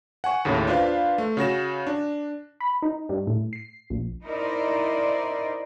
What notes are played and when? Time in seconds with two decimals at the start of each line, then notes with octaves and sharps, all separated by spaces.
0.24 F#5 G#5 C#6
0.45 D#2 A2 C#3
0.67 D4 F4 B4 C5 F5
1.18 A3
1.37 C#3 F#4 A#6 E7
1.87 D4
2.60 B5
2.82 D#4
3.09 G2
3.27 A2
3.53 C7
3.90 A#1
4.24 D#4 E4 A#4 C5 D5 D#5